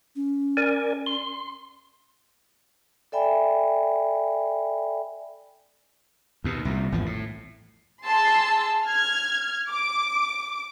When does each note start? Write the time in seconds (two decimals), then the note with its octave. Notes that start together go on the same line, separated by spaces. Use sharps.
0.16 C#4
0.57 A#4 D5 G#5
1.06 C6
3.12 A4 D5 E5 G5 G#5 B5
6.44 D#2 B2
6.65 C2 A#2
6.92 G#1 E2 F3
7.06 A2
8.06 G#4 A5 C6 E6
8.86 F6 G#6
9.70 D6